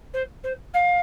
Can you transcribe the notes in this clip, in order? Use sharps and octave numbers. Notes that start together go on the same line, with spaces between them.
C5
C5
F5